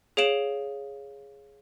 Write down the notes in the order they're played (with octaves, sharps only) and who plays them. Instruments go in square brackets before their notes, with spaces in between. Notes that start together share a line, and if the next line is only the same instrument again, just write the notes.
[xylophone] G#4 C#5 F5 D7 E7 F#7